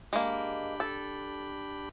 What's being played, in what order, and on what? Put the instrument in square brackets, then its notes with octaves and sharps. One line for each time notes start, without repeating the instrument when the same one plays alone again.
[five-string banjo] G#3 A#3 [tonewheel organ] D4 G4 B5
[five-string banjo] A4